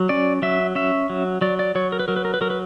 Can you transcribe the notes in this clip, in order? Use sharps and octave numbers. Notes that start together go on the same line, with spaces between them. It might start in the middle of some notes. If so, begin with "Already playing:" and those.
Already playing: F#3
C#4 D5
F#3 E5
C#4 E5
F#3
F#3 D5
D5
F#3 C#5
A#4
B4
F#3 A#4
B4
A#4
B4
F#3 A#4
B4